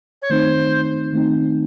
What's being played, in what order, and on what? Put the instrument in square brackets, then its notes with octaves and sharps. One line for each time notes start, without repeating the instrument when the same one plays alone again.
[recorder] C#5
[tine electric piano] D#3 A3 C4 D#4 [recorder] C5
[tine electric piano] D#3 A3 C4 D#4